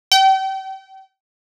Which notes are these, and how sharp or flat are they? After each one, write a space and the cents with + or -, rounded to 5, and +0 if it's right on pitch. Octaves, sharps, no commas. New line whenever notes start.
G5 -35